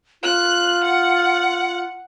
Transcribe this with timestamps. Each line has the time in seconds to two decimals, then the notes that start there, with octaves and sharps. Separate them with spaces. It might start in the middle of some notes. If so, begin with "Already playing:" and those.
0.23 F4 F#6
0.84 F#5